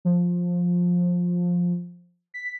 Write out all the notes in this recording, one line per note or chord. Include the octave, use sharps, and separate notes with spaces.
F3
B6